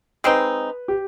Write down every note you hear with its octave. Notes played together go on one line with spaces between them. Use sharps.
G#3 C4 D#4 B4
G4